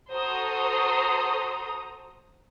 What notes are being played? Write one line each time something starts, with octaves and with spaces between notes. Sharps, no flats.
F#4 A4 C5 A#5 D#6